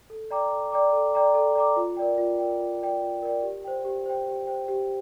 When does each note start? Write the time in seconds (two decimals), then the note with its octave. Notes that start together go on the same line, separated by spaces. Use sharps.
0.10 A4
0.31 D5 G5 A#5 D6
0.52 A4
0.72 D5 G5 A#5 D6
0.93 A4
1.13 D5 G5 A#5 D6
1.35 A4
1.55 D5 G5 A#5 D6
1.76 F4
1.97 A#4 D5 G5
2.18 F4
2.38 A#4 D5 G5
2.60 F4
2.81 A#4 D5 G5
3.02 F4
3.23 A#4 D5 G5
3.43 G4
3.64 C5 G5
3.85 G4
4.06 C5 G5
4.26 G4
4.47 C5 G5
4.68 G4